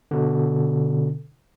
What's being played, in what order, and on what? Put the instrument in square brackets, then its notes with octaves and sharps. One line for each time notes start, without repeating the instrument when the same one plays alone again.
[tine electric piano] B2 D3